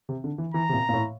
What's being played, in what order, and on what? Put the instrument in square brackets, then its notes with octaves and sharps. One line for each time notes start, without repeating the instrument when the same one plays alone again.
[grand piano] C3
D3
E3
[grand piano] E3 [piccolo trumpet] A#5
[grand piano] C3
A#2
A#2
A2